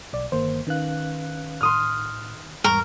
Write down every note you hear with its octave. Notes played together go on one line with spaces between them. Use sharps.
B1 D5
G1 D#3 A#3 C5
D#3 C#4 B4 F5 F#6
A2 C6 D#6 F6
G1 E2 G#2 G3 A#4 C#6